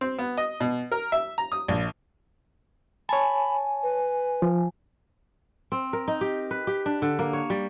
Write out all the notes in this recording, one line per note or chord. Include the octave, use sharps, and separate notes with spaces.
C4
B3
D#5
B2
A#4
E5
A#5
D#6
A#1
C#5 G#5 A5 B5
B4
F3
C4
A#4
D#4
G4
B4
G4
D4
D3
A#3
C#5
G3